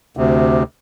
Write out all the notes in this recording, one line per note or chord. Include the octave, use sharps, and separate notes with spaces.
D2 C3